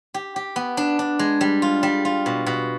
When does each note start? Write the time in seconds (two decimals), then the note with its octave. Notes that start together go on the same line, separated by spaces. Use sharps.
0.14 G4
0.36 G4
0.56 B3
0.77 D4
0.99 D4
1.19 G#3
1.41 G3
1.62 F4
1.83 G3
2.05 F4
2.26 B2
2.46 B2